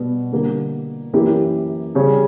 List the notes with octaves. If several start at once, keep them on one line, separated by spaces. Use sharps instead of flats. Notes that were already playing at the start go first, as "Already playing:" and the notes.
Already playing: B2 G3 B3
D3 G3 A#3
F#2 E3 A#3 E4 G4
C#3 G3 C#4